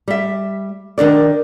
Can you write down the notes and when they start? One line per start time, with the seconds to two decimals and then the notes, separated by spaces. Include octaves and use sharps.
0.08 G3 E5
0.98 D#3 D4 A#4 D5